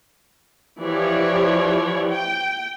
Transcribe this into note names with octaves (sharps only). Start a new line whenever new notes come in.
E3 F3 G4 C#5 D5
G5